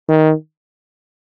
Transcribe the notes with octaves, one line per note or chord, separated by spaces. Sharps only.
D#3